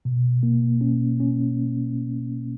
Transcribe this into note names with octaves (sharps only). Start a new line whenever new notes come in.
B2
A#3
C#4
C#4